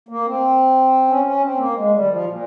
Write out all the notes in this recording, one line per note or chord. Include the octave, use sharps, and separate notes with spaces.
A#3
C4
C#4
C#4
C4
A#3
G#3
G3
D#3
F3
A#2